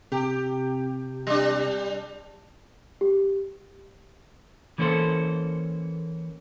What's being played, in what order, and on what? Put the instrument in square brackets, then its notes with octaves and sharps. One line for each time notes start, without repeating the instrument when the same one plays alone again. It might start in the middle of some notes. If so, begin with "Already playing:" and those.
[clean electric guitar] C3 [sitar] G4
[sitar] G3 D4
[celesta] G4
[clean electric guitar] E3 A#3 C#4 A4 C5